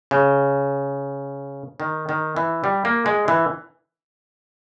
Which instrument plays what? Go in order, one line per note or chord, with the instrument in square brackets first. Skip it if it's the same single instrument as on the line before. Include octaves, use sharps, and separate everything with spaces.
[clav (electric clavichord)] C#3
D#3
D#3
E3
G3
A#3
G#3
E3